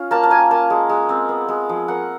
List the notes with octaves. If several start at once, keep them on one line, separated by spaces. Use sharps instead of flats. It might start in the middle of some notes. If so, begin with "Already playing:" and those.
Already playing: C#4 F4
A#3 A5
A5
A#3 G#5
A#3 A5
G#3
G#3
C4
B3
G#3
F3
A#3 F#5